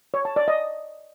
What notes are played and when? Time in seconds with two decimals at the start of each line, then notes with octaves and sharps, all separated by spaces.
0.14 C#5
0.25 A5
0.36 D5
0.48 D#5